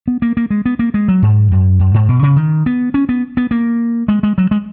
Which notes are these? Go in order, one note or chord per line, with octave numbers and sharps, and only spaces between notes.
B3
A#3
A#3
G#3
B3
A#3
G#3
F#3
G#2
F#2
F#2
G#2
B2
C#3
D#3
B3
C#4
B3
B3
A#3
G#3
G#3
F#3
G#3